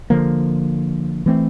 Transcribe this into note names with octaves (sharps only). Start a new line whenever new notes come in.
D3 F3 A#3
E3 A3 C4